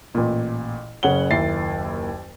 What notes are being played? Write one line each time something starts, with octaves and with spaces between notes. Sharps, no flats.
A1 A#2
F#1 C#3 C#5 F#5 G7
F#1 D#2 E4 A6 C7